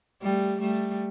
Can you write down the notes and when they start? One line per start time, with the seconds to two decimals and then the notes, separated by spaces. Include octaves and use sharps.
0.22 G3 A3
0.60 G3 A3